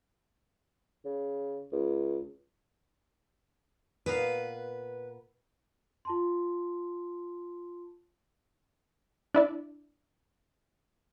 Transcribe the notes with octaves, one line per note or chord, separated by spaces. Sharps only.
C#3
C#2
A#2 B3 B4 F5
F4 A5 C6
D4 E4 D5